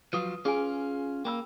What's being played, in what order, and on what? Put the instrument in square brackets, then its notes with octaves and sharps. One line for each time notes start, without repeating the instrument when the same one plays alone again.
[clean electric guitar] F3 F#3 F4 [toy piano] B4 D#6
[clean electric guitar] C#4 F4 [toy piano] G#4 G#5
[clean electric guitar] A#3 [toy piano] G5 B5 E6